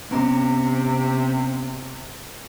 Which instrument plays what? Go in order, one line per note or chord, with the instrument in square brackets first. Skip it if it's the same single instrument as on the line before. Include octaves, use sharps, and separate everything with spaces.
[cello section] C3 [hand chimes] B3 C#4 A#5